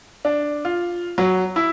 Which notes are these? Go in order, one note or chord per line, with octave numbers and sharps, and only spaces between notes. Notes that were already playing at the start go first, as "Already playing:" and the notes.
D4
F4
F#3
E4